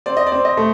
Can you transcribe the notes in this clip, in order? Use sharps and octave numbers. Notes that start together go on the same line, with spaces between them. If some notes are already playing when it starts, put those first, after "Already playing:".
C4 D5
D#5
D5
C4
D#5
A3